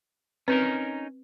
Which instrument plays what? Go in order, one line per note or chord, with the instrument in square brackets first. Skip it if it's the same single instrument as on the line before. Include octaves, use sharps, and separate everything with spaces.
[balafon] C4 B4 [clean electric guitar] C#4 D#4 A#4